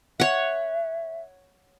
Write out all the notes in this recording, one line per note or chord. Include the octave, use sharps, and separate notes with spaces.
C#5 E5 F#5